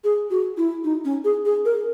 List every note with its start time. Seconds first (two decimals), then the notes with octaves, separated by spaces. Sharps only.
0.04 G#4
0.30 F#4
0.57 E4
0.84 D#4
1.05 C#4
1.24 G#4
1.45 G#4
1.65 A#4